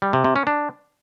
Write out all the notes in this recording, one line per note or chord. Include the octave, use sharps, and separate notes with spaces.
G3
C3
C3
C#4
D4